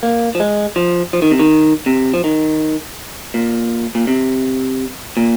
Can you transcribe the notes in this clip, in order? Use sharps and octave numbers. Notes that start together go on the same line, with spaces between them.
A#3
F3
G#3
F3
F3
D#3
C3
D#3
C3
F3
D#3
A#2
A#2
C3
A#2